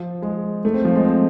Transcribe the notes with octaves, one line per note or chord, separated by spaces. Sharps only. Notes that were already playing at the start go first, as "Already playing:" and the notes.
Already playing: F3
G#3
A3
C4
F3
G#3
C4